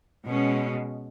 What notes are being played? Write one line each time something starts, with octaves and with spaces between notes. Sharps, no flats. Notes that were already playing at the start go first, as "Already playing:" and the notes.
B2 G#3 C#4